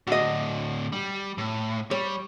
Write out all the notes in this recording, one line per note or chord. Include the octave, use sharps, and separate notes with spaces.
A2 D3 F#4 D#5
G3
A2
G3 C#5